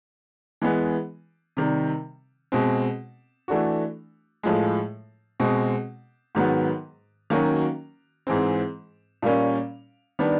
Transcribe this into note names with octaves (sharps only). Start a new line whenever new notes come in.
E3 G#3 B3
C3 D#3 G3
B2 G#3 C4
E3 A3 D4 F#4
A2 F3 G#3
B2 G#3 C4
G#2 D#3 F#3 B3
D#3 F#3 A#3 C#4 F#4
G#2 E3 G#3 C4
A#2 G3 A#3 C#4
D#3 G3 B3 D4